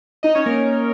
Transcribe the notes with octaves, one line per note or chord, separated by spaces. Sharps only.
D#4 D#5
C#4 C#5
A#3 A#4